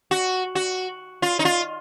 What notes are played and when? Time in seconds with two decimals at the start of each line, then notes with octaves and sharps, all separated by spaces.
0.11 F#4
0.55 F#4
1.22 F4
1.39 D#4
1.45 F4